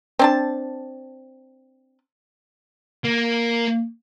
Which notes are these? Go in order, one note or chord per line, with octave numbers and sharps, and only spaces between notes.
C4 D4 A5
A#3